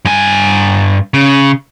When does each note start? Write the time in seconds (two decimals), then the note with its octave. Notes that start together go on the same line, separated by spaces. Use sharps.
0.05 G2 G#5
1.14 C#3